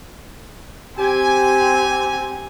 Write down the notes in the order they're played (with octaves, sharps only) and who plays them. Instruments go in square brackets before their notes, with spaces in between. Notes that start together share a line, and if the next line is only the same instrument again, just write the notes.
[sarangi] C4 [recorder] G4 [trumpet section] G#5